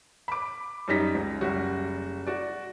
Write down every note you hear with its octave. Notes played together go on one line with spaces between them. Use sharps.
B5 D6
F#2 G3 D#4 A#6 B6
C#2
F#1 G3 F#4
F#4 D5